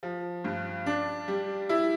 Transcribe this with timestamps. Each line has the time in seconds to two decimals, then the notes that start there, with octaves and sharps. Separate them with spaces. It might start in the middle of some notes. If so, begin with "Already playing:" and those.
0.03 F3
0.44 G2
0.86 D4
1.28 G3
1.69 E4